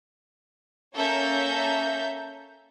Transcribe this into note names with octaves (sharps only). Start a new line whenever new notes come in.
A#3 C#4 A4 E5 A#5 G6